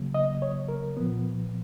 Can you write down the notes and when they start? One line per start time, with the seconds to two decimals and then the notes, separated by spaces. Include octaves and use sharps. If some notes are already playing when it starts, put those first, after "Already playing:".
Already playing: C#3 F#3 A#3
0.14 D#5
0.42 C#5
0.68 A#4
0.97 A#2 F3 B3